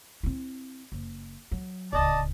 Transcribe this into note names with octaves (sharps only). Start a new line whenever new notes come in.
C4 E4
F#1
F#3
D1 C#2 D5 D#5 A5